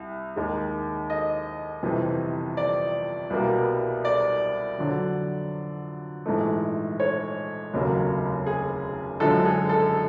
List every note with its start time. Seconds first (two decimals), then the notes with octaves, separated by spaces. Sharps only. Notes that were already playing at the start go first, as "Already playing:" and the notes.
Already playing: C2
0.36 D#2 D#3 G#3
1.10 D#5
1.83 G1 F2 C3 E3
2.57 D5
3.30 C2 B2 G3 A#3
4.05 D5
4.78 F2 D3 F#3
6.26 A#1 G#2 E3 A3
7.00 C#5
7.73 F1 D#2 C#3 F#3 A#3
8.46 G#4
9.20 F#1 F#2 D3 F3 G#3 A4
9.45 G#4
9.69 A4